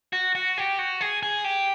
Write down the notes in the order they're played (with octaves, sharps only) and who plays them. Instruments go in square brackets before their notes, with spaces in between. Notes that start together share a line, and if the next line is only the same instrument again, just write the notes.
[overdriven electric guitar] F#4
F#4
G4
F#4
G#4
G#4
G4